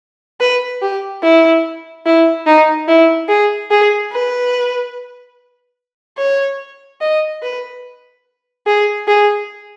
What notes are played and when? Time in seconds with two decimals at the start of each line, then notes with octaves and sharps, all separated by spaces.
0.40 B4
0.82 G4
1.23 E4
2.06 E4
2.47 D#4
2.88 E4
3.29 G#4
3.71 G#4
4.12 B4
6.18 C#5
7.01 D#5
7.42 B4
8.66 G#4
9.08 G#4